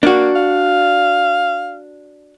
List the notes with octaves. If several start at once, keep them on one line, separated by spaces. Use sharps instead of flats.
A#3 D4 F#4
F5